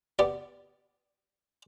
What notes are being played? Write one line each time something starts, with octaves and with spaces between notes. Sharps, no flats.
B3 G4 D5